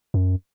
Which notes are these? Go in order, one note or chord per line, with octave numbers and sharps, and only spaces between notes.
F#2